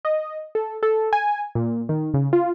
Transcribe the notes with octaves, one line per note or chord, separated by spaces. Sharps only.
D#5
A4
A4
G#5
A#2
D#3
C#3
F4